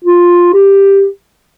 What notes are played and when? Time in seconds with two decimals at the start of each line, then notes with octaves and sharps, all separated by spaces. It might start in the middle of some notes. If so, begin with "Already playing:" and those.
0.05 F4
0.54 G4